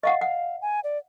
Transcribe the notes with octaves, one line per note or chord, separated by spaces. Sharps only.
D#5 F5 F#5 C#6
F5 F#5
G#5
D5